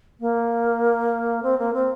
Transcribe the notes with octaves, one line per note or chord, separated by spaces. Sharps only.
A#3
C4
A#3
C4